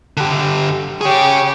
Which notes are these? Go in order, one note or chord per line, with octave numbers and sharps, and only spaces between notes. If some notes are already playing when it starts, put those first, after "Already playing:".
D3 G4
G4 G#4 C#5 C#6